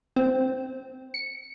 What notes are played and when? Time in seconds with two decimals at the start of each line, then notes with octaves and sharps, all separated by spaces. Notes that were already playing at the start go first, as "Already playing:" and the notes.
0.16 C4
1.14 C#7